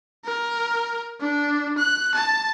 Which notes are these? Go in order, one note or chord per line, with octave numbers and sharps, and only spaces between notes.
A#4
D4
F#6
A5